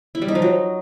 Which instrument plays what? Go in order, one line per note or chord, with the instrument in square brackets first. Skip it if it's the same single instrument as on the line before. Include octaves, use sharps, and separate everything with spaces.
[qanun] E4
G3
D#4
F3
F#3